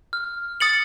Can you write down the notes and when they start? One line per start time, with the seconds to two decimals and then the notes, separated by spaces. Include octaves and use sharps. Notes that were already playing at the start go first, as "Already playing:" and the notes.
0.13 F6
0.60 D#6 A6 C#7 F#7